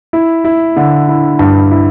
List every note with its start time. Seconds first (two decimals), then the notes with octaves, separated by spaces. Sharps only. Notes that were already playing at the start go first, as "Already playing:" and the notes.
0.13 E4
0.44 E4
0.76 D3
1.08 E4
1.39 G2
1.71 E4